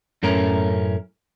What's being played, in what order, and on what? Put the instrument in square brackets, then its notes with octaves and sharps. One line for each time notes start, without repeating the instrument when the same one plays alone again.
[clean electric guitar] F#2 A2 A3 C#4 A#4